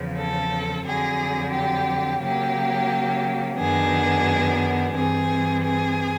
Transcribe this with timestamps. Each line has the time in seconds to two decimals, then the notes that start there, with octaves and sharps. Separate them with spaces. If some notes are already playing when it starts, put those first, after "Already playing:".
Already playing: E2 C#3 F3
0.16 A4
0.84 F2 D3 F#3 G#4
1.52 G4
2.20 C#3 F#3 A#3 G4
3.57 F#2 D#3 F#3 B3 D4 G#4
4.94 G2 E3 G3 C4 G#4
5.62 G#4